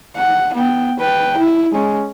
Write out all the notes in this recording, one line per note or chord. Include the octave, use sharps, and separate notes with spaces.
F#5
B3 G5
B4 G5
E4
G#3 C#4